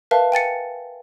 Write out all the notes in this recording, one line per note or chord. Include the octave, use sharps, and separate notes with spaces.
A#4 B4 E5 F5 A5
G5 G#5 A6 C#7